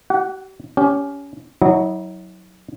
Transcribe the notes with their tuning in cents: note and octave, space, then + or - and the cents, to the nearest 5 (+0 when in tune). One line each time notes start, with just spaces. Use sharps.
G4 -45 F#5 +0
C#4 +25 G4 +0
F#3 +0 E4 -40 D#5 -30